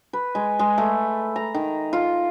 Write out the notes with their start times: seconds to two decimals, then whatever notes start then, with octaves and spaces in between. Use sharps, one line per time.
0.13 B4
0.35 G#3
0.59 G#3
0.78 A3
1.36 A#5
1.54 D#3
1.93 F4